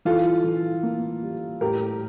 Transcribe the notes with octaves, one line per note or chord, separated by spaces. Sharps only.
E3 F4 A4
E3
A#3
G3
A2 G4 A#4